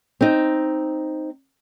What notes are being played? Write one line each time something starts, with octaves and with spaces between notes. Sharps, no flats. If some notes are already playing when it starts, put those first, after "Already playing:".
C4 D#4